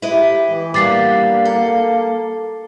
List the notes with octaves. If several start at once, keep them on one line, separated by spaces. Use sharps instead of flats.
E4 G4 B4 D#5
E3
G3 A#3 B3 D4 D6 A6 C7
A4